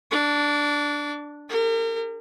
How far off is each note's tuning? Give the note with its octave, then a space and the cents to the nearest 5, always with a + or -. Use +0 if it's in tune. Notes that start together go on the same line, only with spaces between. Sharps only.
D4 +0 D6 -35
G4 +45 A#4 -35